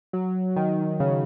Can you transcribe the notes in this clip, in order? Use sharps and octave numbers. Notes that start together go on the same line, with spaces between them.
F#3
D#3
C#3